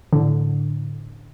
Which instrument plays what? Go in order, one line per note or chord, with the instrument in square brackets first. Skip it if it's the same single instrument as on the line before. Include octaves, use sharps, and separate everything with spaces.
[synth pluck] A2 D3